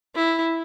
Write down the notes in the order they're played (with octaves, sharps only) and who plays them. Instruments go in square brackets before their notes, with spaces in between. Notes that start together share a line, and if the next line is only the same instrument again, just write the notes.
[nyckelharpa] E4